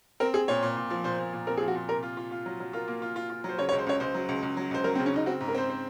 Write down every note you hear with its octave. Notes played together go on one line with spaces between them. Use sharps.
C4 A#4
C4 G#4
A#2 C#5
A#2
A#2
F3
A#2 C5
A#2
A#2
C4 A#4
G#4
F3
F#4
A#2
C3 A#4
F4
F4
F4
F#3
F#3
F4 A#4
A#3
F4
F4
F4
F#3 C5
C#3 C#5
C#5
C#2
C5
C#2 C#5
C#2 C5
F#3
C#2
C#2
F#3
C#2 C5
F#3 A#4
C4
C#3
C#4
C#3 D#4
C4 F#4
G#2
A#4
C4 C5
C5